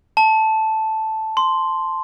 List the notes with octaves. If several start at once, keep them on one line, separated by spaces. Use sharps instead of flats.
A5
C6